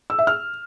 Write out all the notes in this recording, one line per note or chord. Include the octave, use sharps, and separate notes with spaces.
E6
E5
F6